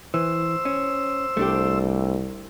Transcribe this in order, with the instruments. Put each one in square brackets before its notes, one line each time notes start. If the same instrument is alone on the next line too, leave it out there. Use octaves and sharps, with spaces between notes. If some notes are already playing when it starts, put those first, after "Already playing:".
[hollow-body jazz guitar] E3 [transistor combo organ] C5 E6
[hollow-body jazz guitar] C#4
[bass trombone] C2 [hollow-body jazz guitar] A3 D4 G4